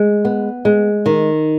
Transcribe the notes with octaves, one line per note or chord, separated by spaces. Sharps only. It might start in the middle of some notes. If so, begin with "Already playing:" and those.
Already playing: G#3
B3
G#3
D#3